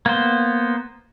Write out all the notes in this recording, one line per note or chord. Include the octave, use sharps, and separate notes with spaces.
A#3 B3 C5